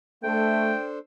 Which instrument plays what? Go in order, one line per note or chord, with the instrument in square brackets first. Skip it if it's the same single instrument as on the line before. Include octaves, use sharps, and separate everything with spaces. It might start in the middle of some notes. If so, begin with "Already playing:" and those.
[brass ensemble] A3 [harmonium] D4 A4 C5 [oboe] G5